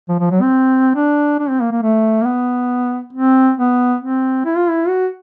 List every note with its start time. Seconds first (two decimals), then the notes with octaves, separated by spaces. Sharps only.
0.09 F3
0.19 F3
0.31 F#3
0.42 C4
0.95 D4
1.39 D4
1.49 C4
1.60 A#3
1.72 A#3
1.82 A3
2.22 A#3
2.26 B3
3.13 C4
3.57 B3
4.01 C4
4.45 E4
4.57 F4
4.69 E4
4.88 F#4